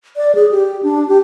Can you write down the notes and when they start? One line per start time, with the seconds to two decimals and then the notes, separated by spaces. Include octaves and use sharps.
0.16 D5
0.35 G#4
0.52 G4
0.83 D4
1.09 G4